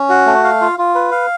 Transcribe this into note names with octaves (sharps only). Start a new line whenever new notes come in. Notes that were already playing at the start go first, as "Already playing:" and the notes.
Already playing: C#4
F#4
A3
F5
F4
F4
B4
F5